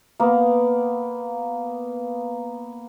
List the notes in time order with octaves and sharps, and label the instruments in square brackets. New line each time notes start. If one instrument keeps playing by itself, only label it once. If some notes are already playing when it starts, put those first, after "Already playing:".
[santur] A#3 B3